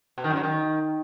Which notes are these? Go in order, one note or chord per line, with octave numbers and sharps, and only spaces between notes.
B2
D#3
F#2
F#3
D#3